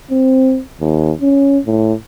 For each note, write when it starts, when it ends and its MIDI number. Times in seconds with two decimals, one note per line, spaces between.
0.11 0.60 60
0.80 1.12 39
1.21 1.59 61
1.66 1.93 45